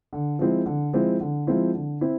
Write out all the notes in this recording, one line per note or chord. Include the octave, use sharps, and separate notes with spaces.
D3
F3 G#3 C4 E4
D3
F3 G#3 C4 E4
D3
F3 G#3 C4 E4
D3
C4 E4